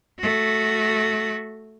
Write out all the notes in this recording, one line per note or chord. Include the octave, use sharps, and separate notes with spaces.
A3 F#4